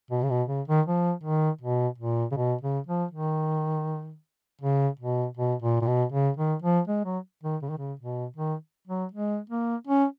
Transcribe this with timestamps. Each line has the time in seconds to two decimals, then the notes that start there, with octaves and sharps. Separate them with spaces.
0.11 B2
0.23 C#3
0.30 B2
0.48 C#3
0.68 D#3
0.86 F3
1.24 D#3
1.61 B2
1.98 A#2
2.31 C#3
2.37 B2
2.61 C#3
2.87 F3
3.11 D#3
4.62 C#3
4.99 B2
5.37 B2
5.62 A#2
5.81 A#2
5.87 B2
6.12 C#3
6.37 D#3
6.62 F3
6.87 G#3
7.05 F#3
7.43 D#3
7.62 C#3
7.70 D#3
7.78 C#3
7.99 B2
8.37 D#3
8.87 F#3
9.12 G#3
9.49 A#3
9.87 C#4